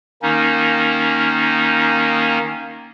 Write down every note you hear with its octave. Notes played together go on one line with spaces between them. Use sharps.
D#3 A#3 C#4 D#4